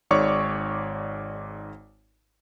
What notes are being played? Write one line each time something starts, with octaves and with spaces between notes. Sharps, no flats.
G#1 G#2 C#5 D5 C#6 D6